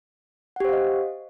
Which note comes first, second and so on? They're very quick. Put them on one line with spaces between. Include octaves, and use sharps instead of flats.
F#5 G4 C5 F5 D#5